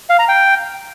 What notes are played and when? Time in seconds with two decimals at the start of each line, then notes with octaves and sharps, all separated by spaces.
0.09 F5
0.19 A#5
0.28 G5